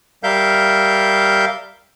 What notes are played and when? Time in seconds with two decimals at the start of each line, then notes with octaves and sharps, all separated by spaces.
0.23 G3 A#4 E5 F5 G6